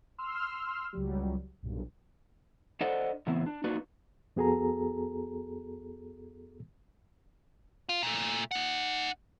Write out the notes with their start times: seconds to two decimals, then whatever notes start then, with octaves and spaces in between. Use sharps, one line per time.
0.18 C6 E6 F6
0.93 C#2 F#3 G3
1.63 B1 G2 A#2
2.81 D4 A4 C5 D5 D#5 F#5
3.27 A2 C#3 E3 B3 C4 E4
3.46 D4
3.64 A#3 D4 D#4 F4 F#4 B4
4.36 F2 B3 F#4 G#4 A4 A#5
7.89 F4
8.03 A#2 A3
8.51 D#4 F#5